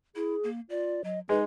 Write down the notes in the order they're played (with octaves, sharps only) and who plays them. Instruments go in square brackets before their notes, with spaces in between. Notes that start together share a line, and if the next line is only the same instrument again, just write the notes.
[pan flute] E4 [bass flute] G#4
[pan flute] A#3
[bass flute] F4 [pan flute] D5
[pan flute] F#3 [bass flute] D#5
[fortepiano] G#3 [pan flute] D#4 [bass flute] B4